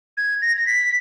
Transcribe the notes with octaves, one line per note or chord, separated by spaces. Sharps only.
G#6
A#6
A#6
B6